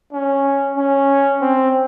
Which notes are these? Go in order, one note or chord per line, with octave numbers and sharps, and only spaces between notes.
C#4
C#4
C4